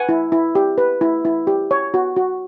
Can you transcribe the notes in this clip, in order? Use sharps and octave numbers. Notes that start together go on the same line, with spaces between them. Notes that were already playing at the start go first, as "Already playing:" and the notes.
Already playing: B4 F#5 G#5
E4
E4
G4
B4
E4
E4
G4
C#5
F#4
F#4